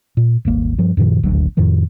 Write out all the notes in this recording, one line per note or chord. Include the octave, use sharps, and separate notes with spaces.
A#2
D#1 G#1 A#3
G2 F3
F#2 A#2 D#3 F3
D#1 G#1 D2 F#3
F2 A2 D#3 F3